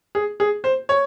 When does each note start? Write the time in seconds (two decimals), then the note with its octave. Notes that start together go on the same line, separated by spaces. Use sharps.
0.15 G#4
0.40 G#4
0.64 C5
0.89 C#5